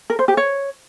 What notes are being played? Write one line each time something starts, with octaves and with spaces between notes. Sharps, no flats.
A#4
C5
G4
C#5